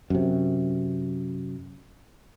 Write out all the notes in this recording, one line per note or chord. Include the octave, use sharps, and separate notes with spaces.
F#2 C3